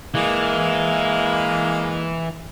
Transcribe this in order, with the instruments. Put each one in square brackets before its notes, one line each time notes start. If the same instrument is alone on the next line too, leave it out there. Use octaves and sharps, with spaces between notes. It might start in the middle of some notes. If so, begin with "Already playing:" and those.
[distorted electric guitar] E3 [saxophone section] G#3 A#3